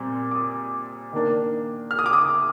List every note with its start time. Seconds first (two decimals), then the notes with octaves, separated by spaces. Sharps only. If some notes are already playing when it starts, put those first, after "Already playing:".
Already playing: A#2 G3 C4
0.31 D6
0.35 D#6
1.13 D#3 A#3 D4
1.91 F6
1.99 D#6
2.06 D6
2.13 D#6